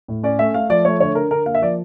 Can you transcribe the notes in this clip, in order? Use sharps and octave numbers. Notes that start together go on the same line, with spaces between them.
A2
C#4 D5
A3 E5
A3 F5
F3 D5
A3 C#5
D3 C#5
D3 A#4
D3 A#4
A#3 F5
E5
F3 D5